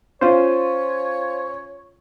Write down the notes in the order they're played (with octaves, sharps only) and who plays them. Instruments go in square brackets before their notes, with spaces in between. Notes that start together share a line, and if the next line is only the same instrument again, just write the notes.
[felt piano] C#4 F4 [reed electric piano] C5 [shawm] C#5